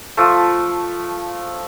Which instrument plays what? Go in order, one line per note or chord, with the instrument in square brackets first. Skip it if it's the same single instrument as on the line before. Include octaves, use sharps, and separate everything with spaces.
[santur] F3 A3